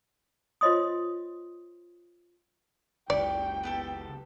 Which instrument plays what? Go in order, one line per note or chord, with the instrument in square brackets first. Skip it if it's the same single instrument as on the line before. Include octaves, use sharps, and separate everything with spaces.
[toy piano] F4 C5 C#5 D#5 C6 D#6
[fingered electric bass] F#1 C#2 [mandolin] G4 C#6 [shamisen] D5 [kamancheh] G5
[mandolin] B3 G4 A4